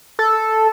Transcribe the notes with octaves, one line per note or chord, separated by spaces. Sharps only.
A4